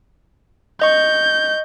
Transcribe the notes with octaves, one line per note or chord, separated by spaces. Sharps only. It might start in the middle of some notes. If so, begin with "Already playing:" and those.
D#5 C#6 G6